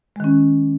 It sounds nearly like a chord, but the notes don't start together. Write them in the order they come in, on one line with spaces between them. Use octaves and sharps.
G#3 D#3 C#4